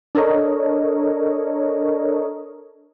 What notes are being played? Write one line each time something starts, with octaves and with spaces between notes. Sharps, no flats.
D4 A4 A#4 C#5 D#5